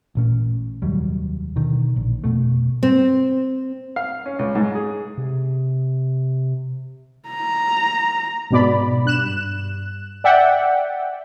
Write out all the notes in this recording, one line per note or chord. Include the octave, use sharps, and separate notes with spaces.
A1 A#2 C#4
F1 D#2 F#3 G3
B2 D3 D#3
A#1
F1 D#2 B2 A3
C4
F5
C#4
C#2
G#2
G#4
C3
A#5
G#2 B2 D5 B5
G2 F#6 E7
D5 E5 F#5 G5